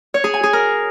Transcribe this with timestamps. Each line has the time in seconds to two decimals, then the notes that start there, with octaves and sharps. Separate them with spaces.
0.14 C#5
0.24 G#4
0.34 G#5
0.43 G#4
0.53 A#4